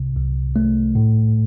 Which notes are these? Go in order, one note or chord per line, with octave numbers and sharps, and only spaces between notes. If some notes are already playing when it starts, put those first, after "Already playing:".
Already playing: C2 C3
C2
A3
A2